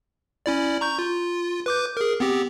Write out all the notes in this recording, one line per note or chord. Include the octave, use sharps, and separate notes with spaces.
C#4 E4 D5
A#5 C#6 G6
F4
B4 D6 G6
G#4 A#4
B3 C4 G4